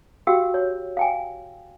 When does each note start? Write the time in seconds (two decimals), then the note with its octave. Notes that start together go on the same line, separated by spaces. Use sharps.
0.27 F#4 G4 F5 G5 E6
0.54 C#5
0.97 F5 G5 G#5